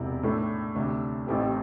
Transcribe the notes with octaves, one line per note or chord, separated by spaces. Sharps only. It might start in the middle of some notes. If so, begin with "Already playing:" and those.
Already playing: E1 C3 E4
A2 A3 D4 A4
D2 C3 A3 D4 A4
A1 A2 A3 C4 G4